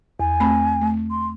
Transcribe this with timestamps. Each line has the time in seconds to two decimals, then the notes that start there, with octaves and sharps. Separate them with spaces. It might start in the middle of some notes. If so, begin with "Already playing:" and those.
0.20 E2 G#5
0.40 A3 C4 B5
0.82 A3
1.10 C6